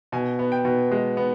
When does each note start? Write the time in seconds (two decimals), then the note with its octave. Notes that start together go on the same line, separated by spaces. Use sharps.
0.12 B2 G#5
0.39 B3
0.52 G5
0.65 B2
0.91 G#3
1.17 B3